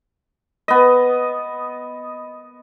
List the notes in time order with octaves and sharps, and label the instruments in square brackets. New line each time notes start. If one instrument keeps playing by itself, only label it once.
[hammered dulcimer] B3 D#5